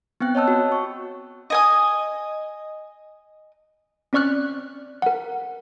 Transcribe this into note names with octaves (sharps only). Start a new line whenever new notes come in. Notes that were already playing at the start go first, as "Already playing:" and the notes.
B3 C4 G5 F#6
C#5 D#5 A5 E6
F#4
C#6
D#5 G#5 D#6
C4 C#4 D5 C#6 F6 F#6
A#4 F#5